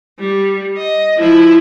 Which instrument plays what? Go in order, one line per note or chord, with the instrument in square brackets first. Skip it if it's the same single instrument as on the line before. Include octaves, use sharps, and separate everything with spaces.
[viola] G3
D#5
F3 E4